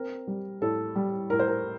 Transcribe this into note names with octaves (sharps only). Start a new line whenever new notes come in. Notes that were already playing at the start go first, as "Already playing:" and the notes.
Already playing: C4 A#4
G3
A2 A4
G3
A2 A#4
C5
A#4